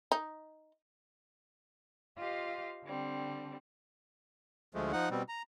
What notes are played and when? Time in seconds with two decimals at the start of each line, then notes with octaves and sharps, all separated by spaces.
0.12 D#4
2.17 F4 G4 C5 D#5 F5
2.84 D3 G3 C4
4.75 D2 F3 G#3 A3
4.92 F3 D#4 F#5
5.11 B2 G3 C4
5.29 A#5